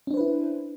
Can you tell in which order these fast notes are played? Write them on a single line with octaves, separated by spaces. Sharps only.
C#4 D4 C5 B4 E4